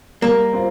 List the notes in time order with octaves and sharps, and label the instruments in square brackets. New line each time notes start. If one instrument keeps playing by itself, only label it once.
[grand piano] G3 [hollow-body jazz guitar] A#3
[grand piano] C4 F4